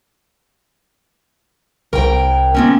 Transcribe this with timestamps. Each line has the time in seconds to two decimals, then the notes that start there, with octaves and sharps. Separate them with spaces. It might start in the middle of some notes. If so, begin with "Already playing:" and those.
1.93 C2 A#4 G5
2.55 A#3 C4 C#4